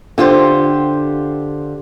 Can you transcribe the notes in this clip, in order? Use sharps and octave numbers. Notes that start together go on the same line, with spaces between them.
D3 F4 G4 C5